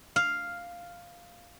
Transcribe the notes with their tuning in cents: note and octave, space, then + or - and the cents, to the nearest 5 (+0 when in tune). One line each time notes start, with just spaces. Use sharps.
F5 +0